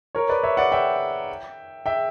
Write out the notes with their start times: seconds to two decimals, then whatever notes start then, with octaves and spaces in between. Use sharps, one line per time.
0.15 A#4 C#5
0.29 B4 D5
0.43 C#5 E5
0.57 D5 F#5
0.72 E5 G5
1.86 E5 G5